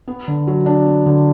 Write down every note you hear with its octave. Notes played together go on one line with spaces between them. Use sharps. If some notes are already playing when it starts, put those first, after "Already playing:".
B3
D3
F#3
D4
B3
D3